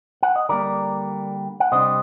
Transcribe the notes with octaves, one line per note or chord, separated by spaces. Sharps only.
F#5
D#5
D3 G3 A#3 A#4 D5
F#5
C3 G3 D4 C5 D#5